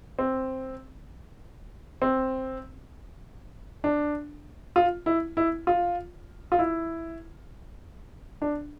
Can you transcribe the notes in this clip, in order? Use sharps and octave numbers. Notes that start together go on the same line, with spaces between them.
C4
C4
D4
F4
E4
E4
F4
F4
E4
D4